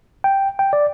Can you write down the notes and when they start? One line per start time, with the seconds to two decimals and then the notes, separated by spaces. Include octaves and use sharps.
0.24 G5
0.59 G5
0.73 D5